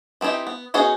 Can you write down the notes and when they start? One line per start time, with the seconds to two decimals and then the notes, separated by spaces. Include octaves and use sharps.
0.21 E3 C4 D#4 E4 G4
0.47 B3
0.74 B3 C#4 D#4 F#4 G#4